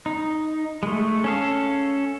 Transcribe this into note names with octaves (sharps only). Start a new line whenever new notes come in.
D#4
G#3 A3
C#4 A4 F5